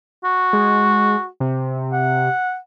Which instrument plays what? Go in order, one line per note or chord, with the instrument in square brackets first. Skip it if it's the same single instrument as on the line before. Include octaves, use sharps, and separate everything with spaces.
[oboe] F#4
[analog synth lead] G#3
C3
[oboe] F#5